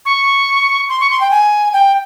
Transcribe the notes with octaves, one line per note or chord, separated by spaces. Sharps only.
C#6
C6
C#6
C6
G5
G#5
G5